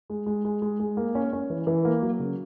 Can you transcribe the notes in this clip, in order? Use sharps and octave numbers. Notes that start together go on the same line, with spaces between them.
G#3
G#3
G#3
G#3
G#3
A#3
C#4
C#4
E3
E3
A#3
F#3
C#3